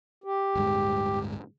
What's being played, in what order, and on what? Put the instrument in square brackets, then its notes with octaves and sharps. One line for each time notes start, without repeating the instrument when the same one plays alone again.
[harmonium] G4
[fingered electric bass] D1 G2 G#3